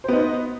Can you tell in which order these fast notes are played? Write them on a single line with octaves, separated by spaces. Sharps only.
C5 B3 D#4